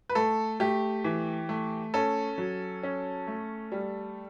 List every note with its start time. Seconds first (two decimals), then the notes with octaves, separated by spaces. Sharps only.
0.09 B4
0.15 A3 A4
0.60 A3 G4
1.04 E3
1.49 A3
1.94 C#4 A4
2.38 F#3
2.83 C#4
3.27 A3
3.72 G3